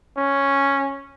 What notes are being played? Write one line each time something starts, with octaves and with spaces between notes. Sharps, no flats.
C#4